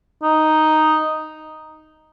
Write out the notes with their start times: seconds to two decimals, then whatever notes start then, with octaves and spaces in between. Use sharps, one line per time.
0.23 D#4